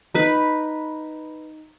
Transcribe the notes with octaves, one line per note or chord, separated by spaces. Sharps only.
D#4 B4